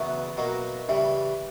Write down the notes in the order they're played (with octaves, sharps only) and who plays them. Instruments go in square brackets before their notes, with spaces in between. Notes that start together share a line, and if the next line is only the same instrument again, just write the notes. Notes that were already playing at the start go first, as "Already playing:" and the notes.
Already playing: [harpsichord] E2 C#3 F#3 B3 [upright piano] E5
[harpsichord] B2 F#3 A#3
[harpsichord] C#3 E3 G3 [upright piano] E5